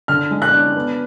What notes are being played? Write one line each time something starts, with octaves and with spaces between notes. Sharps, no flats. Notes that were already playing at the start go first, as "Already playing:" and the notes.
D3 F6
G#3
F#6
D4
B3